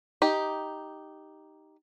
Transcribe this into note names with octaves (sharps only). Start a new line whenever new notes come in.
D#4 G4